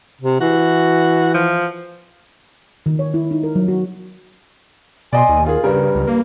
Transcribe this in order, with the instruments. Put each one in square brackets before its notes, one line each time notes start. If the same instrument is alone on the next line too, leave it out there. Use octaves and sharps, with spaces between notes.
[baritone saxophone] C3
[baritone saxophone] E3 [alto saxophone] F#4
[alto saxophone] F3
[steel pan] D#3
C#5
E4
D#4
A#4
F#3
F#4
[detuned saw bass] B2 [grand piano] D5 D#5 C6 [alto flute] G#5
[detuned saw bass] D#2
[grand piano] F4 G#4 [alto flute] A#4
[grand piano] G2 G3 A#4 [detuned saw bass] C#3 [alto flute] B4
[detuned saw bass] C#2
A#3